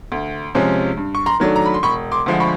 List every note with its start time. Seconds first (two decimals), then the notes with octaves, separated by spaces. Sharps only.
0.12 D2
0.55 C3 F3 G#3 C#4
0.97 G2
1.15 C#6
1.26 A#5 C6
1.40 D#3 F#3 A3 D4
1.56 A#5
1.66 B5
1.74 C6
1.83 E1 B5 C#6
2.12 C6 D6
2.26 D2 D3 F3 G#3
2.40 B5 C#6